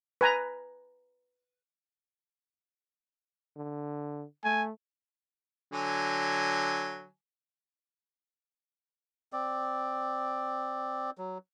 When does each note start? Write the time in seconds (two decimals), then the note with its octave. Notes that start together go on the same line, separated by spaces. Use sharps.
0.21 B4 G#5 A#5
3.56 D3
4.44 A3 G#5
5.72 D3 F#3 G#5
9.33 C4 D5
11.18 F#3